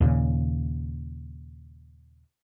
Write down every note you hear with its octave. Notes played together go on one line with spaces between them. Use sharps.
D#2 A#2 C#3